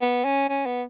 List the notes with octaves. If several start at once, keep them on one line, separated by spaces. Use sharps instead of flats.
B3
C#4
C#4
B3